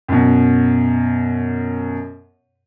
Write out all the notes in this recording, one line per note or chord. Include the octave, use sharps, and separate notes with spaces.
F#2 B2